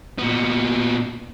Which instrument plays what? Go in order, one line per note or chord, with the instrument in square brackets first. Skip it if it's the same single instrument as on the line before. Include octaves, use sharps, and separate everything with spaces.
[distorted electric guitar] A#2 B3